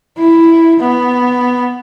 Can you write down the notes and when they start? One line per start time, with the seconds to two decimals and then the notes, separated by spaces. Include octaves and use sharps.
0.17 E4
0.79 B3